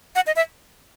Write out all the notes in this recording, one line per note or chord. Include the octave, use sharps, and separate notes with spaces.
F#5
D#5
E5